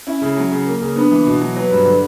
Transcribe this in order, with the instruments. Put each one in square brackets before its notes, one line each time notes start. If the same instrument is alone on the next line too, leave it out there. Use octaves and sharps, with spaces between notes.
[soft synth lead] C#4 [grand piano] E4
[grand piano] C#3
F#3
C#3
A#3
C#3
[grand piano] B3 [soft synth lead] D4
[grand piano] E3
B2
F#3
[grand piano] F#3 [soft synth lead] B4
[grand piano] G2
D3